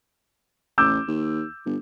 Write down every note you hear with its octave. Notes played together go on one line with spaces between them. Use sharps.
A1 D6 E6 G6
D#2
G1